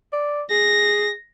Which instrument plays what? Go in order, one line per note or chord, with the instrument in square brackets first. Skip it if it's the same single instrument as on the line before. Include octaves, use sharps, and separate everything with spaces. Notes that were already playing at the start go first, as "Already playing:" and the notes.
[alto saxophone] D5
[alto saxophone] G#4 [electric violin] A#6